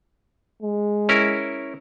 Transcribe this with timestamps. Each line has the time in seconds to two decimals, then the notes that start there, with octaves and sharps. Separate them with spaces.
0.62 G#3
1.09 C#4 E4 A#4